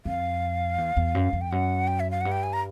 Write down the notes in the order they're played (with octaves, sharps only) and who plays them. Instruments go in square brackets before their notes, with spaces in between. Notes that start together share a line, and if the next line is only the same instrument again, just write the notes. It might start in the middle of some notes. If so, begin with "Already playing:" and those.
[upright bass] F2 [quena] F5
[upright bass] E2
E2
F#2
F2
[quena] G5
[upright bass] F#2 [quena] F#5
[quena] G5
E5
F5
[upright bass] G2 [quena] F#5
[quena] G5
G#5
A#5